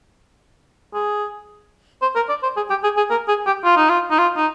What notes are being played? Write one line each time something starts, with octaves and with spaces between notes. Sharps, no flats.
G#4
C5
A#4
D5
C5
G#4
G4
G#4
G#4
A#4
G#4
G4
F4
D#4
F4
D#4
F4
D#4